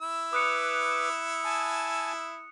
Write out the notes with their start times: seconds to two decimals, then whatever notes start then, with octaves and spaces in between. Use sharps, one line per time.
0.01 E4 E6
0.33 B4 D6 D#6 F#6 C#7
1.45 G#5 A5